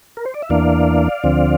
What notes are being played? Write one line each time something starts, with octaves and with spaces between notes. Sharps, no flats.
A#4
C5
D5
E5
E2 E3 A#3 D4 D5 F5
D2 D3 F3 C4